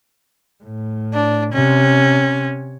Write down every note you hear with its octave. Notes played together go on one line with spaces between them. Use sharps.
A2
D4
C3 C#4